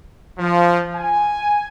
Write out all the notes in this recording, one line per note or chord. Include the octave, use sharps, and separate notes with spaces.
F3
G#5